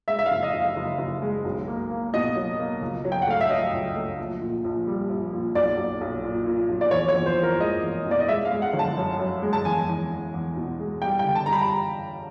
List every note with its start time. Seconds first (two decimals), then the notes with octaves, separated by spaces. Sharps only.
0.08 G#3 E5
0.19 E5
0.26 F5
0.31 F#1
0.43 D#5
0.54 F#1
0.60 F5
0.76 F#1
0.99 F#1
1.22 G#3
1.45 B1
1.68 A#3
1.91 A#3
2.14 B2 D#5
2.36 F#3
2.59 A#3
2.81 C#2
3.05 F#3
3.12 G5
3.22 F#5
3.27 A3 F5
3.41 E5
3.49 F#3 D#5
3.73 C#2
3.96 A3
4.18 A#1
4.41 A#2
4.64 A#1
4.87 G3
5.09 A#1
5.32 A#2
5.55 B1 D5
5.77 B1
6.01 B1
6.24 A#2
6.46 A#2
6.69 B1
6.81 D5
6.91 E2 C#5
7.09 C#5
7.15 E2
7.26 C5
7.37 E2
7.43 A#4
7.59 G#3 D#5
7.82 E2
8.06 B2 D5
8.20 D#5
8.28 G#3 E5
8.45 F5
8.51 G#3
8.62 F#5
8.73 G1
8.79 A5
8.97 F#2
9.19 F#2
9.42 G#3
9.53 A5
9.65 E2 G#5
9.88 E2
10.11 E2
10.34 E2
10.56 B2
10.79 G#3
11.02 G3 G5
11.19 G5
11.25 D3
11.35 A5
11.46 G3 A#5
11.53 B5